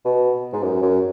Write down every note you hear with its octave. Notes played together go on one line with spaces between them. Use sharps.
B2
G#2
F#2
F#2